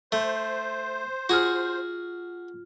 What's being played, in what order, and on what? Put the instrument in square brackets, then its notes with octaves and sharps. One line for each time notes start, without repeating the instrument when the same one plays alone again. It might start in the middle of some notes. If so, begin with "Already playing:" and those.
[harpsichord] A3 [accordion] C5
[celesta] F4 F6 [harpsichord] F#4 G#4